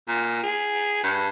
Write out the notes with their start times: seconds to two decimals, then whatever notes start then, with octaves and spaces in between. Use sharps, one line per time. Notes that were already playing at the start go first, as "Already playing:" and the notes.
0.08 A#2
0.43 G#4
1.03 G2